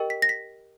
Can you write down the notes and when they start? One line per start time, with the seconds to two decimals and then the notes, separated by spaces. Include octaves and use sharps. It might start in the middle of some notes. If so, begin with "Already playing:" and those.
Already playing: G4 A#4 D#5 G5
0.10 B6
0.22 A#6
0.29 B6